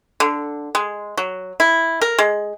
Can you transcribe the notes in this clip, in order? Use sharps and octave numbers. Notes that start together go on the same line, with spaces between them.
D3
G#3
F#3
E4
A#4
G#3